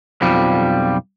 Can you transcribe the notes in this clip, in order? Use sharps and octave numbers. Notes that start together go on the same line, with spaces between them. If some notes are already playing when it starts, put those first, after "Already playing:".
B1 F2 F3 G3